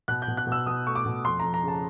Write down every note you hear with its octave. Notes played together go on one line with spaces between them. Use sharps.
B2 F#6
G6
B2
F#6
B2
E6
B2 D#6
A3 C#6
D6
B2
F2 C6
F2 A#5
A#5
C#3 A5